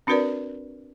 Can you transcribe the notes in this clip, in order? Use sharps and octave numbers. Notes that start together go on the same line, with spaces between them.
C4 D4 F#4 A#4 B4 D5